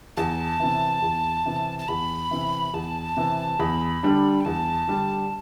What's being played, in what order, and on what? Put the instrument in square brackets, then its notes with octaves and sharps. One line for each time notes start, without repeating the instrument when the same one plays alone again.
[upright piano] E2 [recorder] A5
[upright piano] C3 E3
E2
C3 E3
[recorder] A5
[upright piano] E2 [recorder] B5
[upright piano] C3 E3
[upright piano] E2 [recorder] A5
[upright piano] C3 E3
[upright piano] E2 [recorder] B5
[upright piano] D3 G3 D4
[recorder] G5
[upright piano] E2 [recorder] A5
[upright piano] D3 G3 D4